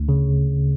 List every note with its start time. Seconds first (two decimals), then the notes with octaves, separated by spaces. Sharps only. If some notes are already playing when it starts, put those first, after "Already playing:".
Already playing: D2
0.09 C#3